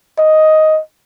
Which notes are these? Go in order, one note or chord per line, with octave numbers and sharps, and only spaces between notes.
D#5